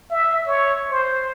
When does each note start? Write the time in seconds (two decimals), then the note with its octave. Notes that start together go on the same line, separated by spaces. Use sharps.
0.11 E5
0.47 C#5
0.90 C5